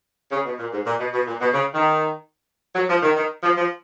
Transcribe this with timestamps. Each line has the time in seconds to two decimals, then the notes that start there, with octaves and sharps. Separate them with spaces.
0.32 C#3
0.45 B2
0.59 A#2
0.72 G#2
0.86 A#2
0.99 B2
1.13 B2
1.27 A#2
1.41 B2
1.54 C#3
1.74 D#3
2.75 F#3
2.89 F3
3.03 D#3
3.16 D#3
3.43 F3
3.57 F3